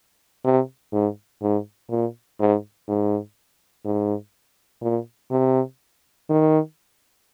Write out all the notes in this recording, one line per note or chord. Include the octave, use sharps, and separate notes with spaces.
C3
G#2
G#2
A#2
G#2
G#2
G#2
A#2
C3
D#3